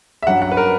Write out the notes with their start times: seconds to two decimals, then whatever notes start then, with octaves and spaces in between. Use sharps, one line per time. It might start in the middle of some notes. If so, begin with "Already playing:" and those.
0.23 E5
0.27 G2 F#3 C#4 F#5
0.42 F#5
0.51 B4
0.57 A#4